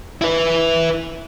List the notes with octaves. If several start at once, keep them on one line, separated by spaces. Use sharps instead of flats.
E4 B4